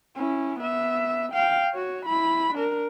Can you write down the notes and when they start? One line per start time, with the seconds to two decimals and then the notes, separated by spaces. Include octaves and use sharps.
0.16 C#4 E4
0.60 B3 E5
1.33 F5 G5
1.73 F#4 C#5
2.06 E4 B5
2.55 D4 A#4